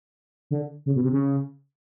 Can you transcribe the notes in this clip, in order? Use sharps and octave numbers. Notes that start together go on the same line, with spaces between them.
D3
C#3
B2
C3
C#3